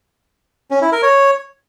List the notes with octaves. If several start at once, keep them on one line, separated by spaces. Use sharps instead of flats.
C#4
E4
A#4
C#5